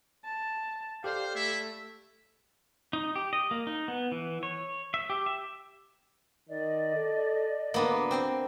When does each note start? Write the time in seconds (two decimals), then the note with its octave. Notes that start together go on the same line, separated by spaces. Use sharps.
0.25 A5
1.04 G4 A4 C5 D5 F5
1.35 A3 E4 E5
2.93 D#4
3.16 G4
3.33 D#5
3.51 A#3
3.67 D#4
3.88 B3
4.12 E3
4.43 C#5
4.94 E5
5.10 G4
5.26 E5
6.49 D#3 D5 D#5
6.95 A4
7.74 D2 A#3 B3 D4
8.11 C4 G5 C6